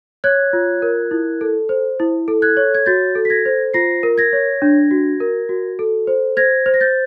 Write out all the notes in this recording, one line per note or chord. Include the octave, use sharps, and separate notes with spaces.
C#5 F#6 G#6
F4
A#4
E4
A4
C5
E4
A4
F#6 G#6
C#5
G#6
F#4 G6 A6
A4
B6
G#6 A#6
C5
F4 A#6 C7
A#4
G#6 A#6
C#5
D4
F#4
A#4
F#4
A4
C5
C5 G#6 A#6
C5
A#6
G6 A6